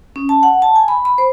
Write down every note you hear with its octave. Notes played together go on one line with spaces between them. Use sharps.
C#4
A5
F#5
A5
G#5
B5
B5
C5